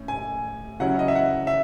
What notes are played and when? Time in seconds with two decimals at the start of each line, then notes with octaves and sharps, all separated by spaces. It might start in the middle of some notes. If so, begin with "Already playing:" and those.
Already playing: A2 C#4
0.08 G#5
0.80 C#3 F#3 C#4 E4 F#5
0.99 D#5
1.08 E5
1.15 F#5
1.47 E5